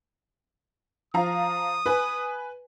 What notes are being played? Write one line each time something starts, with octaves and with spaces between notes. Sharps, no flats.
F3 F5 A#5 D#6
B4 G#5